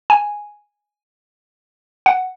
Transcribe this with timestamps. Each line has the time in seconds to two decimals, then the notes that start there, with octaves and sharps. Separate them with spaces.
0.10 G#5
2.06 F#5